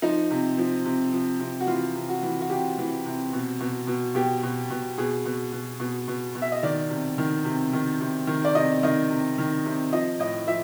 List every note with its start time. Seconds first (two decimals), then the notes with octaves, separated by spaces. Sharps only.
0.02 F3 D#4
0.31 C3
0.58 F3
0.85 C3
1.13 F3
1.40 C3
1.61 F#4
1.67 E3 F4
1.95 C3
2.09 F#4
2.23 E3
2.41 F#4
2.50 C3 G4
2.78 E3
3.06 C3
3.33 B2
3.60 B2
3.87 B2
4.15 B2 G4
4.43 B2
4.70 B2
4.98 B2 G#4
5.25 B2
5.52 B2
5.80 B2
6.08 B2
6.35 B2
6.42 E5
6.52 D#5
6.63 D#3 D5
6.90 C3
7.18 D#3
7.45 C3
7.73 D#3
8.01 C3
8.27 D#3
8.45 D5
8.55 C3 D#5
8.83 D#3 D#5
9.10 C3
9.38 D#3
9.65 C3
9.92 F3 D#5
10.20 A2 D#5
10.47 F3 E5